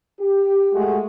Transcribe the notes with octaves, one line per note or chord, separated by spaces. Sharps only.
G4
G#3 A3 F#4